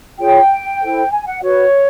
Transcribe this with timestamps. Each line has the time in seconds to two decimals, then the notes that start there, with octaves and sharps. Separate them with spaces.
0.18 F4 G#4 C#5 G5
0.81 E4 A4 C5
1.11 G#5
1.27 F#5
1.43 F#4 B4 C#5